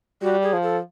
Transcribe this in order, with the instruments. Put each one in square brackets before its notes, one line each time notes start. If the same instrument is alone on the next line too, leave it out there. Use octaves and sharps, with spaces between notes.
[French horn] G3 [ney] F#4
[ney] G#4
[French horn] F3
[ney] A4